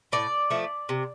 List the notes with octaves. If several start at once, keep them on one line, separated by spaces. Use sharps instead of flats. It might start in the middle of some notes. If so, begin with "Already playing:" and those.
A2 D5
F3 A3
C3